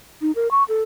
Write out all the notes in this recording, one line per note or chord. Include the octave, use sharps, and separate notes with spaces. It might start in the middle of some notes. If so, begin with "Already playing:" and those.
D#4
A#4
C#6
A4